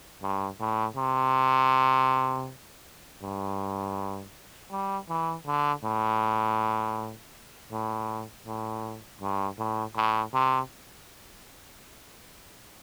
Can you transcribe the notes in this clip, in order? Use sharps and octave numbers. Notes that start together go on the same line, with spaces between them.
G2
A2
C3
G2
G3
E3
D3
A2
A2
A2
G2
A2
A2
C3